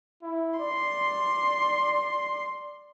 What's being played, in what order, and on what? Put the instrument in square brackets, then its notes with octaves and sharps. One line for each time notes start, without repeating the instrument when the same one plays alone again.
[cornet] E4
[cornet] D5 [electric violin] C6